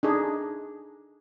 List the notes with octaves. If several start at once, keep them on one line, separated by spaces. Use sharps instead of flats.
D4 D#4 G#4